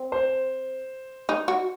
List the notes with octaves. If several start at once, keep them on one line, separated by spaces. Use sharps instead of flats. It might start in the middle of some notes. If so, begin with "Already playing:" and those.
Already playing: C4
C5
D#4
F#4